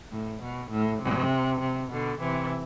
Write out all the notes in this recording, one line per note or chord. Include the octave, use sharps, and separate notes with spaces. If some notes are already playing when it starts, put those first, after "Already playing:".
A2
B2
A2
C3
C3
B2 D3
C3 E3